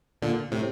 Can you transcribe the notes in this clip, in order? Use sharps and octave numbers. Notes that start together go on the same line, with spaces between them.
A#2 D3
A2 C3